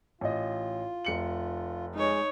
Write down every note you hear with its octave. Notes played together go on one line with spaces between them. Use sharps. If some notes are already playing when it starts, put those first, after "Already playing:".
A1 F4 D#5
F1 C#7 F#7
G#3 D#4 C#5